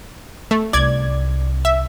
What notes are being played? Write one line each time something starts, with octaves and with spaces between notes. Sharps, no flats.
A3
C2 D5 G#6
E5